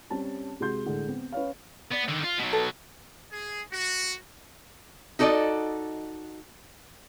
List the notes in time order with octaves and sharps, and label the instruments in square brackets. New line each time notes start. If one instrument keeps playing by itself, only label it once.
[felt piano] G3 C4 C#4 A5
C3 G#3 F#4 C6 G6
A2 D3 G#3
B3 C4
C#4 B4 C#5 F5
[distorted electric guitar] B3 [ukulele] D5
[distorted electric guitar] D3 D#3
F4
B2 F#3
[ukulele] A4 B4
[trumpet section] G#4
F#4
[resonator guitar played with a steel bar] D#4 F#4 A4 D5 D#5